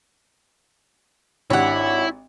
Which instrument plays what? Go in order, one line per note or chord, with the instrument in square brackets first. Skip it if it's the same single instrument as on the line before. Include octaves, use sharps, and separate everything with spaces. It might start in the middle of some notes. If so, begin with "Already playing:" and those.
[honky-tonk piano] G#1 D4 G4 [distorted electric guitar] E4 [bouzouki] C#5 F#5